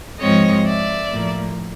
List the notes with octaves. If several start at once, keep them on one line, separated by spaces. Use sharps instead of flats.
G#2 F3 G#3 C4 C#5 D#5
D5 E5
A2 F3 A#3